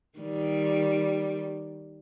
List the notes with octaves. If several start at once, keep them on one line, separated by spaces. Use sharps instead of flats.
D#3 G3